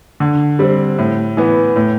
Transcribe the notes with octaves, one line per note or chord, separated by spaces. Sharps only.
D3
G3 C4
A2
E3 B3
A2